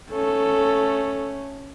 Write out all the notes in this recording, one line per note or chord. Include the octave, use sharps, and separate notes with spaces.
A3 C#4 A4